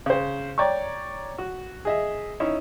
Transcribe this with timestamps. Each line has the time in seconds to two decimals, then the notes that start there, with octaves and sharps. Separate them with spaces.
0.06 C#3 C5
0.58 C#5 D5 G5 A#5 C#6
1.38 F#4
1.85 G#4 D#5 E5
2.40 C#4 D#4 E4 E5